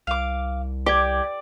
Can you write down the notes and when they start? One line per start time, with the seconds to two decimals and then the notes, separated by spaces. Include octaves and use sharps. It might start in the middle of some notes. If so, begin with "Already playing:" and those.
0.07 C2 F5 D6
0.86 G4 D5 D6 G#6